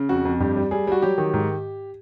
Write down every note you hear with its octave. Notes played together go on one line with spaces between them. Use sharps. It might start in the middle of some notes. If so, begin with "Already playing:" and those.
Already playing: C#3
F2 F#4
F2
G2 G4
G3
G3 G#4
G3 F#4
F#3 G4
D#3
G#2